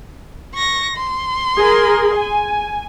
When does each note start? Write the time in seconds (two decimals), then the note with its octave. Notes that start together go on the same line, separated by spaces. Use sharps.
0.54 C#6 A#6
0.96 C6
1.58 G#4 A#4
2.16 G#5